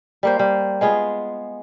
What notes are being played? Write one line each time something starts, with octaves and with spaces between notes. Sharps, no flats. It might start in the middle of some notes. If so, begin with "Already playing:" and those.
G3 A#3 C5
G3
G#3 B3 F4 G#4